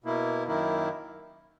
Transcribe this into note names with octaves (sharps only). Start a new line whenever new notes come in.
B2 A#3 E4
F#2 D#3 A#3 E4